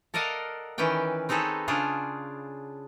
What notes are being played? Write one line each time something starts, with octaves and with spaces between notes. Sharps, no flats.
A4 A#4 D5 D#5 F5 F#5
D#3 E3 C#4 B4 D5 G5
C4 D#4 G#4 A4 B4 C#5
C#3 D4 F4 G#4